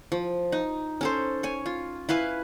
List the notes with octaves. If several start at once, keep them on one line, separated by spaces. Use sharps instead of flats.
F3
D#4
C#4 A4 C5
C#5 G#5
F4
E4 B4 F5 G#5